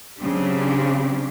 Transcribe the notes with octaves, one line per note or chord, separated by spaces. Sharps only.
C#3 F#3 C4 D4 G4